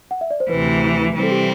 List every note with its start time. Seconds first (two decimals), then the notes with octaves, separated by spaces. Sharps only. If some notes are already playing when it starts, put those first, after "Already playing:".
0.11 F#5
0.21 E5
0.30 D5
0.40 C5
0.50 D2 C3 E3 B4
1.15 C3 E3 G3 C4
1.23 A4
1.31 G4